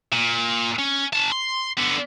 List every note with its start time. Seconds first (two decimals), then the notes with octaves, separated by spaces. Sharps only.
0.12 A#2
0.79 C#4
1.13 C#4 A5
1.32 C6
1.78 D3 B3